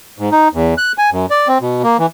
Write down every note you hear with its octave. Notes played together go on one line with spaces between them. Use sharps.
G#2
D#4
E2
F#6
G#5
F#2
D5
C4
B2
A#3
E3